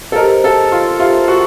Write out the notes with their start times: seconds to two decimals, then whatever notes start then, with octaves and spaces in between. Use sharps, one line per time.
0.12 A4
0.16 G4 A#4 C5 D#5
0.44 A4
0.72 F4
0.99 F4 G4 C5 E5
1.28 F#4